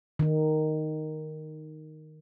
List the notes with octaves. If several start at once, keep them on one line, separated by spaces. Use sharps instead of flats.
D#3 D#4